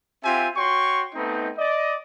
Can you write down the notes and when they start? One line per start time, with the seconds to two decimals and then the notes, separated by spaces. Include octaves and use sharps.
0.24 C4 F4 G4 E5 G#5
0.57 F#4 C#5 G5 C6 C#6
1.15 A3 B3 C4 D#4
1.58 D5 D#5